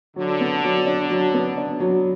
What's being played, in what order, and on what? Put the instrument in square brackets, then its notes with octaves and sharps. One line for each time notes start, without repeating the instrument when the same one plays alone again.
[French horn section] D3 [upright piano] F#3
[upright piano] B3
F#3
D4
F#3
B3
D4
F#3